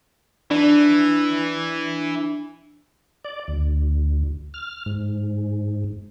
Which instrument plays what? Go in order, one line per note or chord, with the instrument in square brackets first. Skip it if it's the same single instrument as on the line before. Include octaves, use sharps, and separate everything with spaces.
[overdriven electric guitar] E3 [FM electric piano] D4
[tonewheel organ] D5
D2
F6
G#2